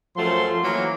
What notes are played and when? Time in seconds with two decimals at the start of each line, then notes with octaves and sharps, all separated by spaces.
0.17 F#2 F3 F#3 A3 C6
0.63 E3 F#3 A#3